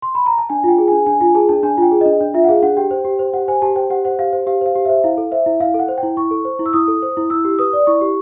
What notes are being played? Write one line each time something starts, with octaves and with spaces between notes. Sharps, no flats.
C6
B5
A#5
A5
D4 G#5
F4 G5
G#4
D4 G#5
D4 G#5
F4 G#5
G#4 A5
D4 A5
D4 G#5
F4 G5
G#4
D4 D#5
D4
F4 E5
F#5
G#4 F5
D4 F#5
G4 G5
C5
G4
C5
G4 F#5
C5 G#5
G4 A5
C5 G5
G4 F#5
C5 F#5
G4 F5
C5
G4 F5
C5 F5
G4
C5 E5
E4 F5
A4
C5 E5
E4
E4 F5
A4 F#5
C5
G5
E4
E4 C#6
A4
C5
E4
E6
E4 D#6
A4
C5
E4
E4 E6
G4
B4 D#6
D5
E4 C#6
G4